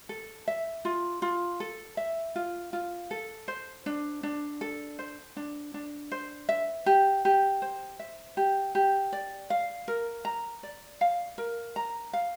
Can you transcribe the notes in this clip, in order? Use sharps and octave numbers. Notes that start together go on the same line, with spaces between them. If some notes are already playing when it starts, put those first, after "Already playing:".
A4
E5
F4
F4
A4
E5
F4
F4
A4
C5
D4
D4
A4
C5
D4
D4
C5
E5
G4
G4
C5
E5
G4
G4
D5
F5
A#4
A#5
D5
F5
A#4
A#5
F5